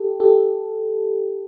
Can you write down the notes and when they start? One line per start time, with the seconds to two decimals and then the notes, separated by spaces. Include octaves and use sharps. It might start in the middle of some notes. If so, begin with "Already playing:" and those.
Already playing: G4 A4
0.20 G4 A4